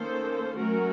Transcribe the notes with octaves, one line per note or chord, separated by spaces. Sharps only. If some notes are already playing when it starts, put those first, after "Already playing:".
Already playing: D#3 A#3 C#4 A4 C5
F#3 A3 C#4 F#4 A#4